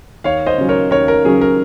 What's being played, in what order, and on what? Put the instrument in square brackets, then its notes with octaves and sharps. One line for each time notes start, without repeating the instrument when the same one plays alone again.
[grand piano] D#2 C#5 F5
C5 D#5
C#3 F#3 C#4
A#4 C#5
D#2 A#4 C#5
A#4
C#3 F#3 C#4 G#4
A#4